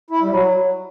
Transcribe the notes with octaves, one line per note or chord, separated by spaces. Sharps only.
E4
G3
F#3